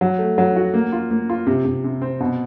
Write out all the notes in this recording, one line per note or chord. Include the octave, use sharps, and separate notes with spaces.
F#3
A3
F#3
F#4
A#3
F4
A#3
F4
C3
C3
C3
C4
B2